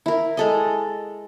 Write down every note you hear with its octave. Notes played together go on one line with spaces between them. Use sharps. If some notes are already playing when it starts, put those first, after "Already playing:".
E4 A#4
G#3 A4 D#5